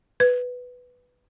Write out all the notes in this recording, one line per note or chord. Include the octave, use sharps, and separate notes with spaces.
B4